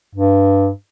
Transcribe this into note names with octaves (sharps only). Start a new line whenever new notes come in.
G2